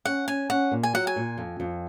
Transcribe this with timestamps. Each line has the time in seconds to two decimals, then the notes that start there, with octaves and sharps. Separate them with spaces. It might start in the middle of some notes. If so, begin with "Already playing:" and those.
0.05 C#4 F#5
0.27 C#4 G#5
0.50 C#4 F#5
0.72 A#2
0.83 G#5
0.94 F#3 F#5
1.07 G#5
1.16 A#2
1.38 F2
1.60 F2